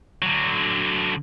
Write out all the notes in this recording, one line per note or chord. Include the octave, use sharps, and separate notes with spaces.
D3 F#3